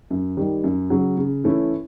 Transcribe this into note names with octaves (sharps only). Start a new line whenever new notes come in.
F#2
D#3 G3
F#2
C#3 F#3
C#3
E3 A3 C#4 E4